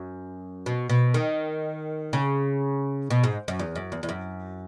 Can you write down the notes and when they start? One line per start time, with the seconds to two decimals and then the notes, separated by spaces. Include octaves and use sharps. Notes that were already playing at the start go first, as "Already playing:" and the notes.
Already playing: F#2
0.66 B2
0.90 B2
1.14 D#3
2.13 C#3
3.10 B2
3.24 G#2
3.48 F#2
3.59 E2
3.75 F#2
3.92 E2
4.03 E2
4.09 F#2